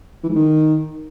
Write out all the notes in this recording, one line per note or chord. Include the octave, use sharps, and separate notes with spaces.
E3
G#2
D#3